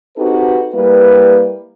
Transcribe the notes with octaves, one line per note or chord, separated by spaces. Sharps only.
C4 D#4 F#4 G4 A4 B4
G3 A#3 E4 B4